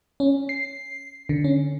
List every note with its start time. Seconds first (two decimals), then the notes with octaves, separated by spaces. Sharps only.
0.20 C#4
0.49 C7
1.29 D3
1.44 C#4